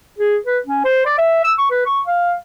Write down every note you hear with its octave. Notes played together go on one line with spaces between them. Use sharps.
G#4
B4
C#4
C5
D5
E5
E6
C#6
B4
C#6
F5